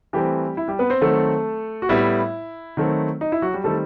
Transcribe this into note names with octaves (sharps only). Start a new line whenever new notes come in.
E3 G3 A3 C4 G4
E4
G3 G4
B3 B4
C4 C5
D#3 F#3 A3 C4 A4
F#4
A2 G3 B3 E4
D#3 F#3 A3 C4
D#4
E4
F#3 F#4
G3 G4
D#3 G3 A3 C4 A4